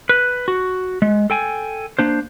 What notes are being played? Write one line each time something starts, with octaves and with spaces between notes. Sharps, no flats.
B4
F#4
G#3
A4 G5 G#5
A#3 D4 C5